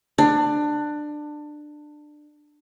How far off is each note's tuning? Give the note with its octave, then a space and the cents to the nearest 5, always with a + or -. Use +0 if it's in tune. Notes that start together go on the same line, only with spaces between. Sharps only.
D4 +20